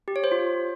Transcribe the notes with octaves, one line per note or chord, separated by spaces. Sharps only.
G4
C#5
C5
F4